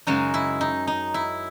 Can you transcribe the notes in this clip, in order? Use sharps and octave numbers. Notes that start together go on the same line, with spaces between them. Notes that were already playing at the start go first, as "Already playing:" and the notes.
F#2 C#3 G#3 D#4 F#4
E4
D#4
D#4
E4